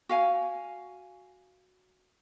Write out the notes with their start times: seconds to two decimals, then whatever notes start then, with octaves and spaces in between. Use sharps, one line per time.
0.09 F#4 F5 G#5